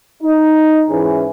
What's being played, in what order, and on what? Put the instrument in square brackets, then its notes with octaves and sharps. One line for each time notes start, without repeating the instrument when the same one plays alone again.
[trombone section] D#4
G#2 E3 C#4 E4 G#4